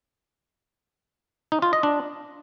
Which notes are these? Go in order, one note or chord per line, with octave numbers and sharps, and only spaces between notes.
D#4
F4
D#5
D4